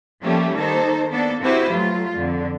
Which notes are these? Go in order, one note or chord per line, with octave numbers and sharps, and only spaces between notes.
F3 G3 A3 A#3 C#4 G4
D#3 A#3 D#4 A4 C5
A#3 B3 D4 A4
C4 E4 F#4 G4 B4 C5
F#3 A3 F4
F2 D3